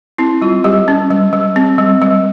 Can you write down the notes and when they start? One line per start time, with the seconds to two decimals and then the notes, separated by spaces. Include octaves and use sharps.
0.18 C4 E4
0.42 G3 F4
0.64 G3 G4
0.88 C#4
1.11 G3
1.33 G3
1.56 C4
1.78 G3
2.02 G3